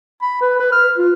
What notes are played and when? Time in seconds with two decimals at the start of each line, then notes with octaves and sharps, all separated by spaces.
0.22 B5
0.41 B4
0.60 B4
0.72 F6
0.97 F4